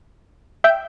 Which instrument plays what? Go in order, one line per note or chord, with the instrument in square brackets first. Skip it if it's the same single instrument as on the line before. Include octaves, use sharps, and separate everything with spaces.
[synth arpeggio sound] E5 G5